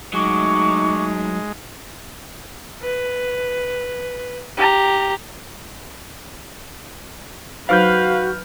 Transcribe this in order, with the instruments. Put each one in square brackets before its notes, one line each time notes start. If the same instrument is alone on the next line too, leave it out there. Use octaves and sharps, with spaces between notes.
[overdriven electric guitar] F#3 [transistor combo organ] G#3 [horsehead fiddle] A3 D#4 [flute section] C#6 D6
[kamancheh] B4
G4 A#5
[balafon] F#3 D#4 C5 [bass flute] F#4 [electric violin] B4 [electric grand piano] F5 F6 G6